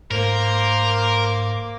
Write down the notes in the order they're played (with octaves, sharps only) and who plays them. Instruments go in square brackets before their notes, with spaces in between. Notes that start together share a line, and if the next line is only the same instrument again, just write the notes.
[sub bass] G#2 [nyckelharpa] A#3 D6 [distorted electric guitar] A#4 [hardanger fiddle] C5 C6